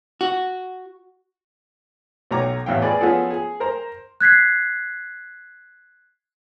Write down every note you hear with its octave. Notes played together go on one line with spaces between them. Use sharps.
F#4
B1 F#3 C#5 A#5 D6
A1 E2 E3 F5 G5
G#4 B4 D5
F3 B3 C#4 F4 G#4 A4
G#4
A#4 C5 A#5
F#6 G#6 B6 C7